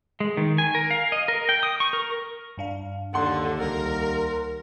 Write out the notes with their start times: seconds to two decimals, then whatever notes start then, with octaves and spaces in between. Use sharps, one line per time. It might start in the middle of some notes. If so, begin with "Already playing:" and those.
0.20 G#3
0.37 D#3
0.58 G#5
0.75 A#4
0.91 F5
1.12 D#5
1.28 A#4
1.49 G5
1.63 D#6
1.80 C#6
1.93 A#4
2.58 G2 D4 F5
3.14 D#2 D3 F#5 C6
3.59 C#2 G3 A#4